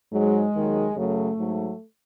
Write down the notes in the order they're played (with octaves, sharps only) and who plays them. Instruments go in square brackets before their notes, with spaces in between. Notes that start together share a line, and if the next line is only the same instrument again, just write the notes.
[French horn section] G#2 F#3 G#3
D#2 D#3 F#3
F#2 C#3 F#3 A3
G#2 F#3